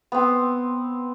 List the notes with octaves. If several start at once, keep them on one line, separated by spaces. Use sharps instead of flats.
B3 C4